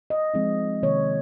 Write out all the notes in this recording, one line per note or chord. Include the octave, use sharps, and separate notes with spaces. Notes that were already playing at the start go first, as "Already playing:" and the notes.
D#5
F3 G#3 C4 D#4
C3 D#3 A#3 C#5